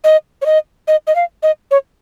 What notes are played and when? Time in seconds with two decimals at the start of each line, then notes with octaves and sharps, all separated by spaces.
0.04 D#5
0.42 C#5
0.46 D#5
0.88 D#5
1.07 D#5
1.15 F5
1.43 D#5
1.71 C#5